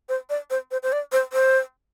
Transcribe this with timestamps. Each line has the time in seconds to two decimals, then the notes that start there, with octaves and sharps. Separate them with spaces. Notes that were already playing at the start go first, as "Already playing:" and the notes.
0.09 C5
0.29 D5
0.50 C5
0.71 C5
0.83 C5
0.92 D5
1.12 C5
1.33 C5